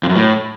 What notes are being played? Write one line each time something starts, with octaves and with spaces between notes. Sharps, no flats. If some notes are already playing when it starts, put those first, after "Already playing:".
F2
F#2
A2